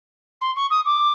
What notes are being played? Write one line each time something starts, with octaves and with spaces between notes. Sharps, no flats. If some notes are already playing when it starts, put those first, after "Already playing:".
C6
C#6
D#6
D6